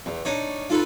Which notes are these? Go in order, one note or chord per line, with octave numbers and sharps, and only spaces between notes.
E2
D4 D#4 C#5
D#4 F4 A4 B4